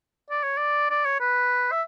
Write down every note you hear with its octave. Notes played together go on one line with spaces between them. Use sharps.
D5
C#5
D5
D5
C#5
B4
E5